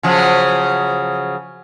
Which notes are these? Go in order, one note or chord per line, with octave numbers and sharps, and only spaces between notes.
C#3 F3 F#3